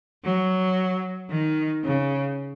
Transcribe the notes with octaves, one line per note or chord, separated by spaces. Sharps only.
F#3
D#3
C#3